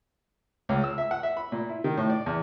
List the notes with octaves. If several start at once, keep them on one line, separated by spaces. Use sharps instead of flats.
C#2
E6
E5
F#5
E5
B5
A#2
E4
D#3
A2
D5
E2